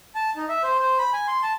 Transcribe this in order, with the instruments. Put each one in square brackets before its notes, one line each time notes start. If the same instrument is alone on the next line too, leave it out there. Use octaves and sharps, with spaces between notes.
[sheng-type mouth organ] A5
D#4
E5
C5
C5
B5
G#5
C6
A5